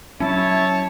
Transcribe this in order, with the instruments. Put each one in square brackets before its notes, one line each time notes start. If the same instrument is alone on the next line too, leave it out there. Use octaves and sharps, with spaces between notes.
[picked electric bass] F#3 C#4 [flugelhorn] E4 [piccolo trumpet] C#5 [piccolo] A5